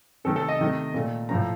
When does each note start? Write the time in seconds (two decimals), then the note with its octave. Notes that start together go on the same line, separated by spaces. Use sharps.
0.24 C3 D#3 A3 A4
0.36 A4
0.48 D#5
0.59 C3 D#3 A3
0.94 A#2 A3
1.29 A2 F3 A3 A#5